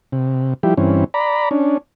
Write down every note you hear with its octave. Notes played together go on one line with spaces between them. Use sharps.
C3
F3 G3 E4 G4
G2 E3 C4 C#4
D5 A#5 B5
C#4 D4